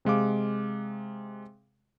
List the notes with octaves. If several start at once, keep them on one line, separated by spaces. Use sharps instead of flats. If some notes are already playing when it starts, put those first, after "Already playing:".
C3 G#3 F5 D6